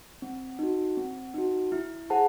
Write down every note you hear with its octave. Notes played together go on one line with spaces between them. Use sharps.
C4
D#4 F#4
C4
D#4 F#4
E4
G#4 C5 F#5 A5